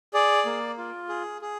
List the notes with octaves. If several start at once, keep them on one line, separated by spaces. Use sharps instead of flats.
G#4 D5
A#3
F4
G#4
G#4